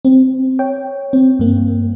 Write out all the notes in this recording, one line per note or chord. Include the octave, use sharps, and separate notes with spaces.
C4
C#5 G5
C4
G2 A#3